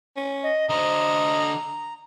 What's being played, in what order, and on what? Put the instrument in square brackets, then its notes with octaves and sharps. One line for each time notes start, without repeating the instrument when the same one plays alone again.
[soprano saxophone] C#4
[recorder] D#5
[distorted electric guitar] D3 C5 [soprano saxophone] D#5 [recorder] A#5